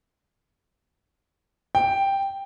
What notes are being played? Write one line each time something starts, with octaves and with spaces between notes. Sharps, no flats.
G5